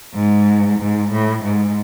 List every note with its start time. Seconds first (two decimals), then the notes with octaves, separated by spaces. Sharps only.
0.14 G#2
0.79 G#2
1.12 A2
1.44 G#2